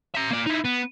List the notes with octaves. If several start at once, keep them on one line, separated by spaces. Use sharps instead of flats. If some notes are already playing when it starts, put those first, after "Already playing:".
E5 A#5
A#3 D5
D#4 E4
B3